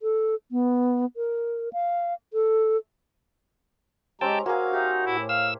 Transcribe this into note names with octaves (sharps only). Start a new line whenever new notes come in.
A4
B3
A#4
F5
A4
G#3 C4 C#4 G4 G5 A5 A#5
A#3 F#4 G#4 F5
D#4 G4 E5
A2 E4
F5 E6